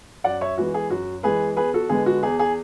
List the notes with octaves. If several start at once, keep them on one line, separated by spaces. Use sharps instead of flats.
F#2 D5 F#5
C#5 E5
E3 G#3 B3 F#4
G#4
F#2 F#4
E3 G#3 B3 G#4 B4
E2 G#4 B4
F#4 A4
D3 G#3 B3 G#4
F#4
E2 G#4
G#4